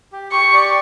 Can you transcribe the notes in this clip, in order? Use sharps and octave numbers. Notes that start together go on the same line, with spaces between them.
G4
G4 C#6
D5